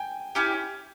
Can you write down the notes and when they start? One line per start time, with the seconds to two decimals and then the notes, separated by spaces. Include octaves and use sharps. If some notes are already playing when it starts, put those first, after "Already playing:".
Already playing: G5 G#5
0.35 C#4 E4 G4 G#5